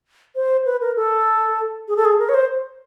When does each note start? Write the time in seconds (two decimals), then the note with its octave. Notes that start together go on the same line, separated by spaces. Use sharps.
0.36 C5
0.66 B4
0.81 A#4
0.96 A4
1.88 G#4
1.96 A4
2.05 G#4
2.19 A#4
2.29 C#5
2.34 C5